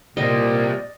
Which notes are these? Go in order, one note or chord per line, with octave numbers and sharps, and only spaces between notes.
A#2 G3 C4 D5 D#5